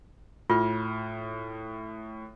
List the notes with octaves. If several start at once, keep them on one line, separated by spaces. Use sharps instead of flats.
A2 F4 F6